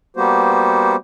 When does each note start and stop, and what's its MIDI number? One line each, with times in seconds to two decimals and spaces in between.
0.17 0.96 55
0.17 0.96 58
0.17 0.96 59
0.17 0.96 66
0.17 0.96 67
0.17 0.96 72